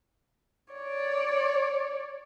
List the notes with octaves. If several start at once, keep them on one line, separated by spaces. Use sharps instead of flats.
C#5 D5